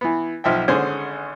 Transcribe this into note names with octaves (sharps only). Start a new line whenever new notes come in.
E3 B3
B1 F3 E5 G5
G#1 D3 C#4 G#4 C5